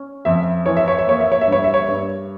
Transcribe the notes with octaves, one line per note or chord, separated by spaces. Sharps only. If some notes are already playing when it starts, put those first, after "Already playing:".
Already playing: C#4
F2 E5
E3 C#5
E5
C#5
E5
A#3 C#5
E5
C#5
E5
G2 C#5
E5
C#5
G2